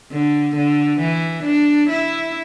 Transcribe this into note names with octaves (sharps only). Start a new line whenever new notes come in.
D3
D3
E3
D4
E4